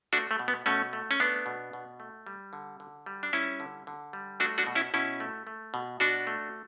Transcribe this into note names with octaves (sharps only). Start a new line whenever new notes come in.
A3 D4 F#4
A3
B2
B3
B2 A3 C#4
A3
C#4
A3 B3 D4
B2
B2
A3
G3
D3
D3
G3
D4
G3 C#4 E4
D3
D3
G3
A3 D4 F#4
D4 F#4
B2
C#4 E4
B2 C#4 E4
A3
A3
B2
B2 D4 F#4
A3